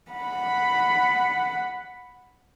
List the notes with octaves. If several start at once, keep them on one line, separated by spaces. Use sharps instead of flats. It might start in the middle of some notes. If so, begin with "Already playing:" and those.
F#5 B5